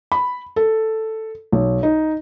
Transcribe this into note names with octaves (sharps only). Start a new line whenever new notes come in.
B5
A4
B1
D#4